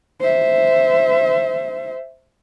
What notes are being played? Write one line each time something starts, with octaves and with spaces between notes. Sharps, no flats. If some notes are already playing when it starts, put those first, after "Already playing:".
C5 E5